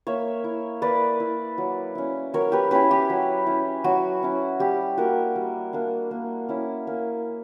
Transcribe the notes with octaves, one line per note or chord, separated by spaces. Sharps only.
A#3 C#5 E5
E4
A#3 B4 D5
E4
F#3
C#4 E4
F#3 A#4 C#5
G4 B4
C#4 E4 G4 B4
G4
F#3
C#4 E4
F#3 F#4
C#4 E4
G3 G4
A#3 D4 F#4 A#4
G3
A#3 D4
A#3
C#4 E4
A#3